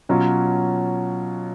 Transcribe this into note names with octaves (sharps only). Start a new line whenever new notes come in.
B2 F#3 C#4 F4